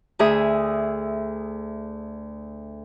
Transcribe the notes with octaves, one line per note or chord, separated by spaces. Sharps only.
D2 G#4 E5 D#6